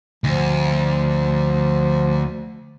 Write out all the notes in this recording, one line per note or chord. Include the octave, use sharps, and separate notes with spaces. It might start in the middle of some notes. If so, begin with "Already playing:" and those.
D2 F3